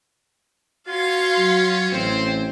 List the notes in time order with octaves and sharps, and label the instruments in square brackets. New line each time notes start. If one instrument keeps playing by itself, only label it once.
[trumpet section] C#4 F4 C#5 [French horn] F#4 [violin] F5 C6
[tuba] F#3
[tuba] A1 [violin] C4 [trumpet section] C5